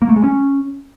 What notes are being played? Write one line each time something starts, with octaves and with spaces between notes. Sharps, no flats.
A#3
A3
G#3
C#4